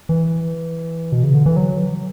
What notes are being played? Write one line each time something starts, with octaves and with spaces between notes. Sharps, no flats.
E3
B2
C#3
D3
E3
F#3